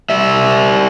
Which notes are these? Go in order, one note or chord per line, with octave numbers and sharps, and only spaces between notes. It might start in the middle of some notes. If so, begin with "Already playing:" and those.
G3 E5